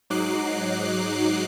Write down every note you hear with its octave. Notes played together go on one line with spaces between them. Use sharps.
G#2 F#3 D#4 D6 F#6 C7